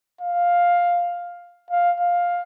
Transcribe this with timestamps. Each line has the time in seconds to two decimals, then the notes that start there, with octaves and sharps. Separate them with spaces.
0.21 F5
1.70 F5
2.00 F5